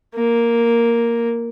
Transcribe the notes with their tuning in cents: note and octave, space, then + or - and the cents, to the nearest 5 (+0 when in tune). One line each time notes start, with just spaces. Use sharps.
A#3 +0